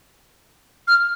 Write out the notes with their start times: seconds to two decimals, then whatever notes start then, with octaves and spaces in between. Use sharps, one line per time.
0.88 F6